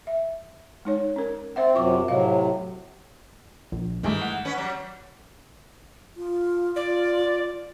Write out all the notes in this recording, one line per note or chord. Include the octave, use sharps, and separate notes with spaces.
E5
G#3 D#4 C#5
C#4 A#4
C4 C5 E5 F#5
F#2 C3 F4 C#6 D6
A2 C3 F#3 D#5 F5
A#1
G2 D#3 E3 G#3 A3
F#5
C#4 B4
F#3 G3
F4
F4 D5